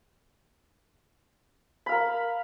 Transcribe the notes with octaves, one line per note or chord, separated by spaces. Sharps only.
A#4 F5 B5